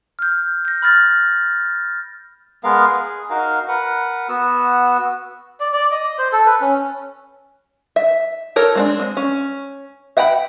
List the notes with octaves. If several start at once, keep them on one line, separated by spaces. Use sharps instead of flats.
F6 G6
G6 A#6
B5 F6 A6 A#6
G#3 B3 A#4 F5
G#4
D#4 F#4 A#4 F5
A#4 B4 F#5
B3 F#4 E6
D5
D5
D#5
C5
A4
B4
C#4
E5
A4 A#4 C#5
G#3 C4 D4
G#3
C#4
E5 F#5 G5 A#5 B5